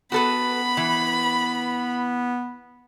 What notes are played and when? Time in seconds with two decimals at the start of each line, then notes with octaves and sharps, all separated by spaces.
0.12 B3 F#4 A4 B4 B5
0.77 E3